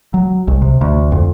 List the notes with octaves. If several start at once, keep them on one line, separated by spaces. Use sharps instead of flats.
F#3
C2
C3
D2
F2